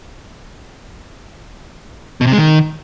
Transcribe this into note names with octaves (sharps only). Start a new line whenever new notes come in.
B2
C3
G#3
D#3